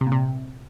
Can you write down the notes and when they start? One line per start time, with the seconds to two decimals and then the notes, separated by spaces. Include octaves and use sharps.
0.01 C3
0.06 A#2
0.12 C3